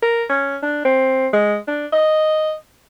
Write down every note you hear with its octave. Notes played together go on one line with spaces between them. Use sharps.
A#4
C#4
D4
C4
G#3
D4
D#5